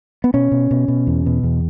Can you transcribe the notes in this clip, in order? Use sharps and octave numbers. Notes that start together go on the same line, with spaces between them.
B3
B2 C#4
B2
B2
B2
E2
B2
E2